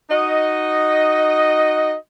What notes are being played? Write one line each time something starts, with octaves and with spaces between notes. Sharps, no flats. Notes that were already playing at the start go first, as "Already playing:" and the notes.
D#4 F#4 D#5